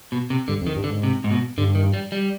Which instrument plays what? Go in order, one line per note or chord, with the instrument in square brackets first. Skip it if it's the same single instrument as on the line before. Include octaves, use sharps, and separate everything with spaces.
[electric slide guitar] B2
C3
[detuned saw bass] G2 [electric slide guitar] D3
[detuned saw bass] F2
[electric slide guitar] D#3
[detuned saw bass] G2
[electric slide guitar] D3
[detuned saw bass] G#2
[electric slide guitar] C3
G#2
B2
[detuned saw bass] G2 [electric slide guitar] D3
[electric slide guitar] D#3
G3
G3